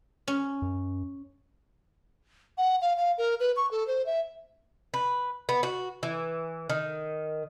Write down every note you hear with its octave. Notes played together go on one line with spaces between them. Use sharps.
C#4
F#2
F#5
F5
F5
A#4
B4
C#6
A4
C5
E5
B4
B3
F#4
E3
D#3